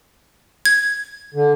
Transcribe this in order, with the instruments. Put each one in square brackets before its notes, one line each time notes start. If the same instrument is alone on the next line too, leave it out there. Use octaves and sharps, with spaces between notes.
[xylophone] G#6
[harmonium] D3